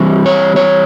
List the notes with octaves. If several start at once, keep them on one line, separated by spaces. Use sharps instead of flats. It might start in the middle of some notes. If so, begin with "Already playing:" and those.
Already playing: E3 G3 C4
C#5
C#5